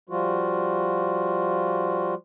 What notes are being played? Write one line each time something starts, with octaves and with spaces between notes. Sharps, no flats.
F3 G3 F4 F#4